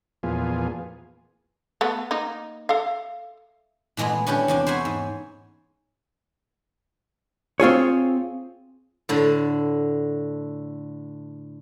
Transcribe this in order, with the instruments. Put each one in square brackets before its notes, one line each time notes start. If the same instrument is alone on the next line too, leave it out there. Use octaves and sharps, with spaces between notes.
[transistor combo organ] E2 A#2 F3 B3 F4 G#4
[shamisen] A3 B3
A#3 D#4
A4 E5 F5
[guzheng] A#2 E3 G#3 A3 B3
C#4 D4 E4 G4 A4
E2 C3 D4
C5 C#5 E5 F#5 G#5 B5
G#2
[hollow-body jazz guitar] C4 F4 G#4 C#5
[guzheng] A2 D3